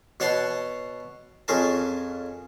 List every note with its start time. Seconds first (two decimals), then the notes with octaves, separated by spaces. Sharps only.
0.20 B2 C#5 F#5 A5 C6
1.48 F2 C#4 G#4 A#4 A5